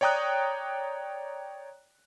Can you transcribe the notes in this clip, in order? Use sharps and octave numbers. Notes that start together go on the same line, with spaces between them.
C#5 D5 G5 A#5 D#6 F#6